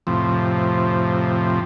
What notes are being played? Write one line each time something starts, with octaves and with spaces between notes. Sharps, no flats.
F2 A2 C3 F3